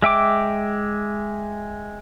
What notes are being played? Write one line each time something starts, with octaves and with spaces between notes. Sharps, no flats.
G#3 E5 G5 D6